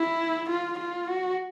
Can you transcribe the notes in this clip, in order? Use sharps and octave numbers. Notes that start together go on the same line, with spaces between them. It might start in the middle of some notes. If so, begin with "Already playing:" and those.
Already playing: E4
F4
F4
F#4